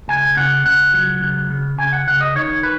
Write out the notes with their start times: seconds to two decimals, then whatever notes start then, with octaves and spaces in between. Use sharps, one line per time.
0.08 C#2 G#5
0.37 C#3 F#5
0.65 C#2 F#5
0.94 F#3
1.21 C#2
1.50 C#3
1.78 C#3 G#5
1.93 F#5
2.07 C#3 F#5
2.21 D#5
2.35 D#3 C#5
2.63 B4